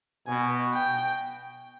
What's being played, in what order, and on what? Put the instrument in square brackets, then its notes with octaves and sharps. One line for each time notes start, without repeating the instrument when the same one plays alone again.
[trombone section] B2 [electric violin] G#5
[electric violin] G5